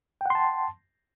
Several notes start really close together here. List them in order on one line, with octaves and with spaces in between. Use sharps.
G5 F#5 C6 A5